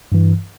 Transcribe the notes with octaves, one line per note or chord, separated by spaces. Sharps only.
G2 E3